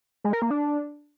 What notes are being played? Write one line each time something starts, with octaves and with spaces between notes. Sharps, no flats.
G#3
A#4
A#3
D4